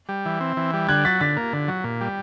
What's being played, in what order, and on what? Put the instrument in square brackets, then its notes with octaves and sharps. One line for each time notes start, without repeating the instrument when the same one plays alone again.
[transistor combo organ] G3
E3
C4
E3
G3
[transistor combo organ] D3 [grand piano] F#6 G#6
[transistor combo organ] F#3 [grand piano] A6 B6
[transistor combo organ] D3 [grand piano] A6 B6
[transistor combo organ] A#3
D3
F#3
A#2
G3